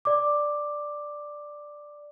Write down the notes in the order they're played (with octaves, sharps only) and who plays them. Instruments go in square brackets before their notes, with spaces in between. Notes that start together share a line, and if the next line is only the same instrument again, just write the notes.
[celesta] D5 D6